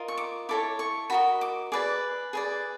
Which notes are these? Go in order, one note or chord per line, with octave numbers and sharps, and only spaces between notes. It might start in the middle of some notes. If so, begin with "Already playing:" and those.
Already playing: F4 A#4 D#5
C#6
D6
E4 A4 C#5 D6
C#6
F#4 A#4 D#5 B5
D6
G#4 B4 D5 D6
G#4 B4 D5